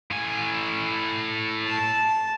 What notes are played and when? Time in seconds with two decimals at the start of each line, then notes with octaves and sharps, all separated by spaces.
0.11 A2 G#5
1.67 A5